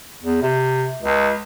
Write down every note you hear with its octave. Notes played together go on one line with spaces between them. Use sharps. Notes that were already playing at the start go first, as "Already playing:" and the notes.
E2
C3
C#2